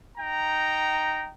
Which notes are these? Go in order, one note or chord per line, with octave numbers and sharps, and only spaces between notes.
D#4 G5 A#5